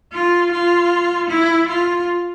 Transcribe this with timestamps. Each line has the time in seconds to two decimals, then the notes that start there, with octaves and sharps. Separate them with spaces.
0.12 F4
0.51 F4
1.29 E4
1.68 F4